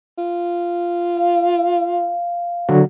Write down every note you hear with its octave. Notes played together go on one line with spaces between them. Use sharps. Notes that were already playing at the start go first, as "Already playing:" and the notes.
F4
F5
D3 F#3 F#4